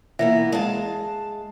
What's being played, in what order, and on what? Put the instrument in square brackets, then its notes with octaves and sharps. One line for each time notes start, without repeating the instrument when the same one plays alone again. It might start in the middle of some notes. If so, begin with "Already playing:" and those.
[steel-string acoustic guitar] E3 A#3 B3 [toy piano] E5
[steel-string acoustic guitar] G#3 F5 A5